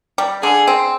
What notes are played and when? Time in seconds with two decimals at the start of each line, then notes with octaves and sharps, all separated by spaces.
0.18 G3
0.42 D3 G#4
0.67 C4